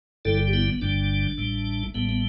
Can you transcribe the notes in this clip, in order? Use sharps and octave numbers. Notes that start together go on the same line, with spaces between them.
G1 G2 D3 G3 E4 A4
G4
B3 E4
B3
G1 G2 D3 G3 D4
A1 A2 G3
A1 A2 G3 B3
B3